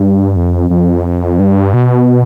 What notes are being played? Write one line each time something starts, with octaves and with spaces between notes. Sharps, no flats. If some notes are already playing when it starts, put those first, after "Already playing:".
Already playing: G2
F2
F2
G2
B2